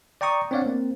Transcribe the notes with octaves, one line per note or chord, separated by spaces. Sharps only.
D5 G5 A#5 C#6 D#6
C4 D4 C#5 D5 F5 F#5
A#3 C4